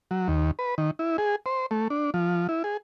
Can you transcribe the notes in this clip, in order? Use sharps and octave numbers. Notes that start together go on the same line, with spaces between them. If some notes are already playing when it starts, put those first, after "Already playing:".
F#3
D#2
B4
D#3
E4
G#4
C5
A3
D4
F3
E4
G#4